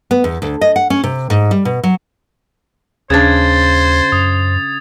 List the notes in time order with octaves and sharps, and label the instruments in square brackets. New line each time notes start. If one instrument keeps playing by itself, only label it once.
[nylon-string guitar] B3
E2
D2
D#5
F#5
C#4
C3
G#2
G3
B2
F#3
[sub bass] D#2 [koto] C#3 D4 [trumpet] C5 [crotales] G#6 A6
[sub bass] F#2 [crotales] D#6